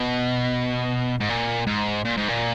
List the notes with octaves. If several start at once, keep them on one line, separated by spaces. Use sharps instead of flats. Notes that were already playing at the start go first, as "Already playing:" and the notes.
Already playing: B2
G#2
A#2
G#2
A#2
G#2
A#2